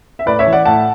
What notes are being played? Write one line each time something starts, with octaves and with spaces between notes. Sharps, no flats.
E5
A2 B4 D5
C#5 E5
E3
D5 F#5
A2 F#5 A5